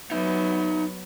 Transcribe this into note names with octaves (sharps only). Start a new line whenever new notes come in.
F#3 B3 D#4 E5